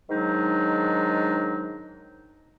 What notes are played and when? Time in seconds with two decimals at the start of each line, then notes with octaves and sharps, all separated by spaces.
0.10 G#2 D#3 F#3 G#3 D4 D#4